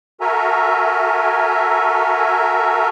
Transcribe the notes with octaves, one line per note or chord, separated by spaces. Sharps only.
F#4 A4 A#4 E5 G#5 A#5